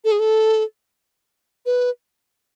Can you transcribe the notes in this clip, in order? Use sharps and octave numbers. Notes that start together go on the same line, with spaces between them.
A4
G#4
A4
B4